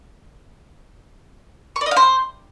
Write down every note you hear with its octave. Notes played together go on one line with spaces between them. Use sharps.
C#6
D5
D#5
F5
C5